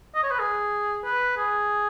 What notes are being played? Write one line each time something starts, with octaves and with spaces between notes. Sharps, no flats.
D#5
C#5
B4
G#4
B4
G#4